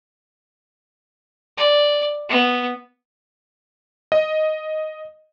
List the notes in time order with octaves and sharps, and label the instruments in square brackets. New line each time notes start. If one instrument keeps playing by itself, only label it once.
[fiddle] D5
B3
[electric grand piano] D#5